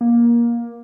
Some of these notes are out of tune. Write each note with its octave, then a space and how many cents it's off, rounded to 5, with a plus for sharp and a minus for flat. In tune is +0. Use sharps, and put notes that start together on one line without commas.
A#3 +15